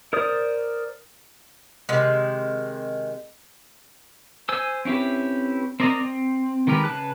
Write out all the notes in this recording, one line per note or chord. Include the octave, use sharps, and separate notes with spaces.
A#4 C5 D5 D#6
C3 D#3 G#3
C5 G#5 E6
C4 C#4 E4 G4 B4
C4 A#4 D5 D#5 A#5
C4
D#3 G#3 G4 A#4 B4
C#3 B4 A5 F#6